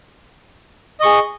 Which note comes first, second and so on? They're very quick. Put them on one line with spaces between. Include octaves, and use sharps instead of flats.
D#5 C#6 G#4